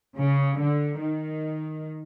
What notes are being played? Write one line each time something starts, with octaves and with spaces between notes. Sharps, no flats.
C#3
D3
D#3